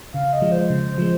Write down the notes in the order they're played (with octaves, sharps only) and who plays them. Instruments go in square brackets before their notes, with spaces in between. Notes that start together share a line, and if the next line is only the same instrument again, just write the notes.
[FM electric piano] C#3 [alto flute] F5
[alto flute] D#5
[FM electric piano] F3 G#3
[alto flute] C5
[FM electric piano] C#3
F3 G#3